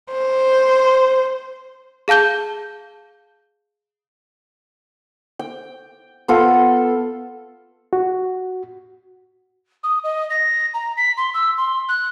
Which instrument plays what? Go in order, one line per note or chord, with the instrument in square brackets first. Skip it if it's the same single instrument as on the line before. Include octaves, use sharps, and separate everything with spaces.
[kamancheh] C5
[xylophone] G#4 F5 A5 G6 G7
[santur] G5
B3 F4 A4
[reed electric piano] F#4
[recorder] D#6
D#5
A#6
A#5
B6
C6
E6
C6
F#6